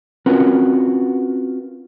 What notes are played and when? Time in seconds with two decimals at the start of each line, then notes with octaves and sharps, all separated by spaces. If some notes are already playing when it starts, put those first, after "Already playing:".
0.26 C4 C#4 F4 F#4 A#4 B4